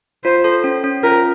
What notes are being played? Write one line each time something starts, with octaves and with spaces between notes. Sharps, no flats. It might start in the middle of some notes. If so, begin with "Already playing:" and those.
F4 C5
A4
C#4
C#4
F4 A#4